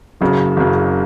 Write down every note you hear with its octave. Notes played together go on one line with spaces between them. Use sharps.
F#1 F#2 C#3
F#1 F#2 C#3